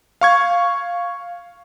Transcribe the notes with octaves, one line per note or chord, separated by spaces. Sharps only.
F5 C#6 G#6